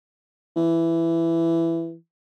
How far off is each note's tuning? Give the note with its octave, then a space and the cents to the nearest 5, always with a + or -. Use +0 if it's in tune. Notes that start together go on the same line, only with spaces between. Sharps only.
E3 +10